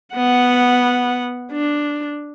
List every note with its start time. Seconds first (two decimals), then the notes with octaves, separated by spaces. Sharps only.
0.15 B3 F#5
1.52 D4